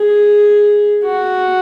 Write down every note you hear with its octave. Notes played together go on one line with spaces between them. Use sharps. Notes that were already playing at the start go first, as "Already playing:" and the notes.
Already playing: G#4
F#4